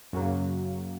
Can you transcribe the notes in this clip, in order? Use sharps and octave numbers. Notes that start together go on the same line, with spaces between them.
F#2 C#3 F#3 A#3